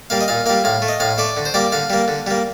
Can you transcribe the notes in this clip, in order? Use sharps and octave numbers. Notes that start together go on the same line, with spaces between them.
G3 A#3 F5
D#5
A#2 F5
G3 A#3 F5
A2 F5
A3
D#5
A2 F5
A3 D5
D3
C5
G3 A#3 D5
D3 F5
G3 A#3
D3
G3 A#3